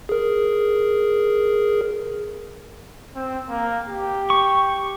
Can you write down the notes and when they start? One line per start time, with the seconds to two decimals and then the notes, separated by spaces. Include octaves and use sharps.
0.09 G#4 A#4
3.15 C4
3.49 A#3
3.88 G4
4.30 C#6